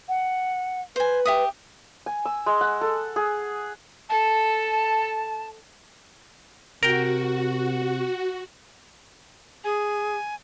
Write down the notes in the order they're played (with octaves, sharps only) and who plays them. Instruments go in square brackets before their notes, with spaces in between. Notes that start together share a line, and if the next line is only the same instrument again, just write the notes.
[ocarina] F#5
[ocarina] B4 [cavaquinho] C5 G#5
[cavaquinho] G4 E5 D#6
[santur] G#5
E6
G#3
F#5
A4
G#4
[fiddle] A4 [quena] A5
[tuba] C3 [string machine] F#4 [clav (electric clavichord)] A#4 G5
[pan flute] G#4 [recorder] G#5